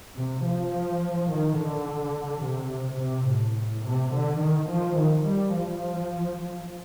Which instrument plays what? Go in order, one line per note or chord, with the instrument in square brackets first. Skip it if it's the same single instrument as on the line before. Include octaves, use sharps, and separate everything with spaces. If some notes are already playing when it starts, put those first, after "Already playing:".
[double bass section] C3
F3
D#3
D3
C3
C3
A2
A2
C3
D3
D#3
F3
D#3
G3
F3